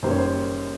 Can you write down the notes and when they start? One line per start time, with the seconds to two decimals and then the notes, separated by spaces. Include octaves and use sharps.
0.03 F#1 F#2 D#3 G3 A#3 C5
0.11 C#5
0.18 C5